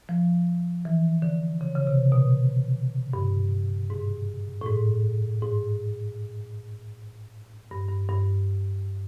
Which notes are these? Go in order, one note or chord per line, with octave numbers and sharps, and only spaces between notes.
F3
E3
D3
C#3
C#3
C3
B2
G2
G#2
A2
G#2
G#2
G2
G2
G2